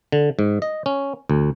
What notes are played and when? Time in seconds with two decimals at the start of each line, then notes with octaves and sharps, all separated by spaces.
0.12 D3
0.39 G#2
0.62 D#5
0.86 C#4
1.30 D2